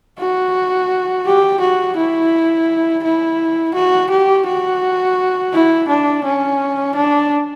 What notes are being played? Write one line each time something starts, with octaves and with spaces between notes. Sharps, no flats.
F#4
G4
F#4
E4
E4
F#4
G4
F#4
E4
D4
C#4
D4